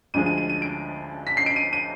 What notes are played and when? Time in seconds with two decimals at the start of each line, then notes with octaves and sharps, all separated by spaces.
0.14 D2 D3 F3 G#3 D#7
0.26 D#7
0.38 D#7
0.49 D#7
0.62 D7
1.27 B6
1.37 C7
1.46 D7
1.56 D#7
1.73 D#7